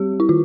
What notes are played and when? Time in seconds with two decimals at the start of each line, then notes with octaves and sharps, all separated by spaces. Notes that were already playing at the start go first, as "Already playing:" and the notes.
Already playing: G3 C4 G4
0.20 E4
0.29 D#3 F4